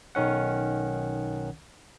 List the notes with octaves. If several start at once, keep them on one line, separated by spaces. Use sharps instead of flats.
B1 D#3 C#4 F#5